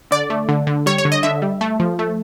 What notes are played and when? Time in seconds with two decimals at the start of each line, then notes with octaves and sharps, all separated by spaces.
0.11 D3 D5
0.30 A3
0.49 D3
0.67 D3
0.86 G3 C#5
0.98 C#5
1.05 D3
1.12 D#5
1.23 D3 E5
1.42 G3
1.61 A3
1.80 F3
1.99 A3